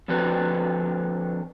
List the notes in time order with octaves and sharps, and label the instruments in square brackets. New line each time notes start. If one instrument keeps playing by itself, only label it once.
[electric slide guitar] D3 F3 C4 D4 F#4 B4